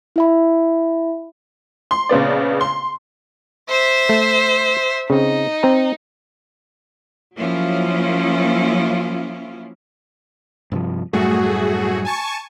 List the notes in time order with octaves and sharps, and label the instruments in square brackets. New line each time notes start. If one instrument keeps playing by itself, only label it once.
[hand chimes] E4 E5 B5
[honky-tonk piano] C6
A#1 C#3 B3 D5
C6
[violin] C5 E5
[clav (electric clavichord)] A3
[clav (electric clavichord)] C#3 C4 [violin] D#4
[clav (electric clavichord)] C4 A#5
[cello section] F3 F#3 A#3 C#4 E4 F4
[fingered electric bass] G2 C3 F3
[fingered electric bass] F#2 A2 G3 [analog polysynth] A3 F#4 G#4
[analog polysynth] G#5 A5 C#6